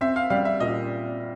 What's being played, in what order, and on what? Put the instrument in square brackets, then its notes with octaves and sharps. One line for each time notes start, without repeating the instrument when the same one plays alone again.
[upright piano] C4 [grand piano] E5
[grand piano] F5
[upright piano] G3 [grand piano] F5
[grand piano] E5
[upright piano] A#2 [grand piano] D#5